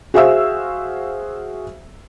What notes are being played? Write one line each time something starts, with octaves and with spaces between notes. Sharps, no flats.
F#4 G#4 C5 E5 F5 E6